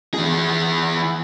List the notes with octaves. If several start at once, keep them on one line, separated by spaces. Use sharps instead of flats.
E3 G#4